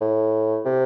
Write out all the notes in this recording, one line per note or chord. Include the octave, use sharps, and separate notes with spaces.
A2
C3